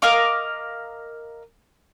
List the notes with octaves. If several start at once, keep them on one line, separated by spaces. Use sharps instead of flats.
A#4 D#5 F5 D6